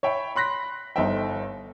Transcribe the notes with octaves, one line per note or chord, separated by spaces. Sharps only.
C#5 E5 G5 B5
B5 C6 F#6 A#6 B6
G1 D#4 A4 C5 E5 G5